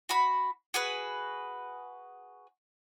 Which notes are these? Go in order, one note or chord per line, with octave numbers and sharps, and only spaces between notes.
F#4 B5
F#4 G#4 B4